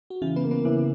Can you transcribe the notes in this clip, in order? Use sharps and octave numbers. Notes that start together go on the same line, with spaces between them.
F#4
C#3 E3 E4
B3 B4
A#3
B3 B4
C#3 E3 C#4